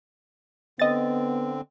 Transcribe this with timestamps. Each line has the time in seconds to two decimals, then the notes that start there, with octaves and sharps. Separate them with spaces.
0.79 D3 B3 C4 D#5 A6